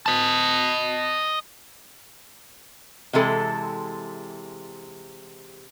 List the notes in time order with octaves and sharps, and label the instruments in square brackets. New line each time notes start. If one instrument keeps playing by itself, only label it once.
[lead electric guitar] D#5 A5
[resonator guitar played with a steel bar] C3 E3 G#3 A4